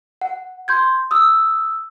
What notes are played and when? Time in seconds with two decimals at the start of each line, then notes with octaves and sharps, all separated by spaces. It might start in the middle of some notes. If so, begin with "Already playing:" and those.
0.21 F#5
0.68 C6 G6 G#6
1.11 D#6 E6